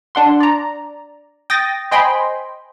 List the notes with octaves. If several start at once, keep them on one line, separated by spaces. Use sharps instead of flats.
D4 F#5 C6
D5 A#5
G5 D#6 A6 A#6
C5 D#5 G5 G#5 B5 C6